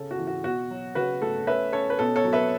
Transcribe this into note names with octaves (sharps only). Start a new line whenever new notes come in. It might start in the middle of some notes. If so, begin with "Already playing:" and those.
Already playing: C#3 A4
F#4
E3
F#4
B2 F#4
F#3
C#3 F#4 B4
A3 A4
C#4 B4 E5
C#4 A4 C#5
B4
B2 A4
A4 C#5
F#3
B4 E5